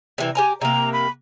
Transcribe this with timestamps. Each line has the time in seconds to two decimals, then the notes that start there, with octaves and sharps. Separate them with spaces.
0.18 C3 E3
0.35 G4 G#5 A#5
0.61 C3 A#3 A#5
0.93 B5